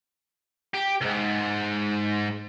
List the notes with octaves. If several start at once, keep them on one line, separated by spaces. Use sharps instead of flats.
G4
C#2 G#2